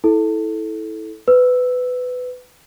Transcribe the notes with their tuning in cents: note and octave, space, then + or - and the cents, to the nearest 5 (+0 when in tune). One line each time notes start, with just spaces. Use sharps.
E4 -20 A4 -15
B4 +20 E6 +0